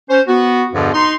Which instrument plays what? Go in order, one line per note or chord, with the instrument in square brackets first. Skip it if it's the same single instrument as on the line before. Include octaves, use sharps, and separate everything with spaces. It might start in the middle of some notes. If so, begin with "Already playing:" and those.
[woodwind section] C#4 C5
B3 F#4
E2 G2 B2 D3 F3
D#4 C6